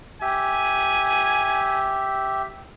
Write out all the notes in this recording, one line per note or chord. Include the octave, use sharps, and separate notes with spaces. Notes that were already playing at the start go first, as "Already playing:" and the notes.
G4 E5 G#5